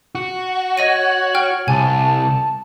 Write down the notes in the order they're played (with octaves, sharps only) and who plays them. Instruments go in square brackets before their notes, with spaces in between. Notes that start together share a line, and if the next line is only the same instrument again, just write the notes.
[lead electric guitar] F#4
[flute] C#5 [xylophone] D#5 A#6 D#7
[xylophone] G5 F6
[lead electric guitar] C2 [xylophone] G#5 [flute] A5